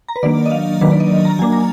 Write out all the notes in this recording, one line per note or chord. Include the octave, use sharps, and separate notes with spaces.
A#5
B4
D#3 F#3 A#3 D4 D5
D#5
F5
D#3 F#3 A#3 D4 B4
D5
D#5
A#5
F#3 A#3 D4 G#5
A#5